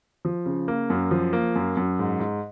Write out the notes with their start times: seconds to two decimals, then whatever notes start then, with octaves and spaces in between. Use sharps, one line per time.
0.25 F3
0.46 C#3
0.68 A#3
0.90 F#2
1.11 F3
1.33 A#3
1.56 F#2
1.77 F#2
1.99 G#2
2.20 G#2